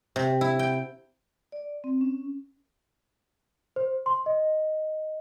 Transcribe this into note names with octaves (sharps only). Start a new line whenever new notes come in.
C3
E4
G5
D5
C4
C#4
C5
C6
D#5